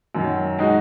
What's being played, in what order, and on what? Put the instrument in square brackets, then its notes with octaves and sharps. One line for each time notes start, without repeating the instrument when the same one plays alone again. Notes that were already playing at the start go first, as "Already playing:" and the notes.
[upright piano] F#2 D#3 F#3
G#3 D#4 F#4